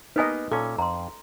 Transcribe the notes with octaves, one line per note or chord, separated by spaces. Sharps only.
A#3 B3 D#4 G4 B4 D#5 G#5
A#2 C#4 A4 D6
F2 A#5 C6